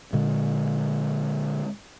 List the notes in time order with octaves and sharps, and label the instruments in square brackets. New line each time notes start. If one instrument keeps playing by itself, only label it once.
[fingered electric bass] A#2 D3 G#3